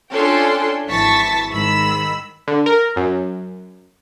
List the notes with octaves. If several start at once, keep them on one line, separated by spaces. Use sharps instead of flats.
C#4 D4 F4 A4 G5 C6
G#1 E3 A5 C#6 A6 B6
G#2 D#3 B5 E6
D3
A#4
F#2